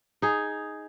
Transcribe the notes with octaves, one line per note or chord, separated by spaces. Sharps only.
D#4 G#4